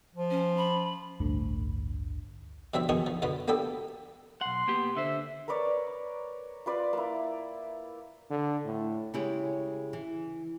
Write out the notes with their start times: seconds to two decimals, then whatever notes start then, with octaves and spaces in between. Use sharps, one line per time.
0.15 F3
0.31 C#4
0.57 B5
1.20 A1 D2 G2 D3
2.74 B2 G3 C4 D4 E5
2.89 A#1 B2 D#3 G#4 C#6 D#6
3.07 F3
3.22 F2 B2 D3 B3
3.48 A#3 B3 D4 G4 A4
4.41 B1 F#5 C6
4.68 A#3 B3 G4
4.97 D3 C5 E5
5.48 A#4 B4 C#5 D5
6.66 F4 B4 D5
6.93 A#3 E4
8.30 D3
8.65 A2
9.14 C#3 G#3 E4 G4 C#5
9.93 E3